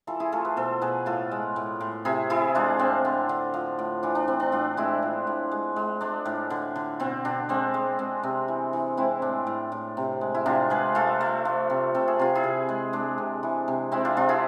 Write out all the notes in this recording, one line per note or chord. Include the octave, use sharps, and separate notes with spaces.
E3 F4 A4
E4 G#4
A3 F4 A4
G#4 B4
B2 A4 C5
B2 G#4 B4
A2 F4 A4
G#3
A2
A2
C3 E4 G#4
E3 E4 G#4
G#3 D4 F4
A2 C4
D3
D3
F3
A2
E3 D4
D4
E3 C4
D4
A2 D4 F4
G#3 C4 E4
F3
A2
G#3
G#3
G#3 D4
A2
D3
D3
B2 C4
B2 D4
G#3 C4
G#3
G#3 C4
C3
E3
E3
G#3 C4 E4
A2 D4
A2
A2
C3
G#3
E4
C3 D4 F4
G#3 G#4 B4
A3 F4 A4
A3
F3
C3
C3 A4
G#4
C3 F4
E4 G#4
C3
G#3
G#3 D4
C3
E3
C3
G#3 C4 E4
D4 F4
C3 D4 F4
E4 G#4